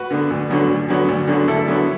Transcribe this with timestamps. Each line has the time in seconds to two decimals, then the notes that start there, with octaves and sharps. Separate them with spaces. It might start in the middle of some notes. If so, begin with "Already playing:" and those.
Already playing: F#4 B4
0.10 D3 B3
0.30 D2
0.50 D3 F#3 B3
0.69 D2
0.89 D3 F#3 B3
1.08 D2
1.27 D3 F#3 B3
1.48 D2 E4 A4
1.68 D3 F#3 B3